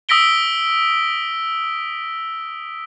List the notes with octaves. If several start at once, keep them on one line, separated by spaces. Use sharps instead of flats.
D#6 E6 A#6 B6 D7 G7